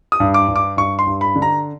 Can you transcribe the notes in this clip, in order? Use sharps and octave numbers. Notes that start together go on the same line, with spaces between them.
D#6
G2
D6
G2
D6
G2 C#6
C6
G2
B5
D3
A#5